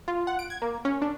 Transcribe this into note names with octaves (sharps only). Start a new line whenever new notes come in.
F4
F#5
D7
G#6
A#3
C#4
D4